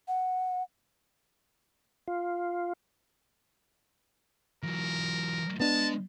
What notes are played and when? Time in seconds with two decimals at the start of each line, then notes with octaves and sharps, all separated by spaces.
0.08 F#5
2.08 F4
4.63 E3 F#3 A#4
5.60 G#3 B3 D4 D#5 A5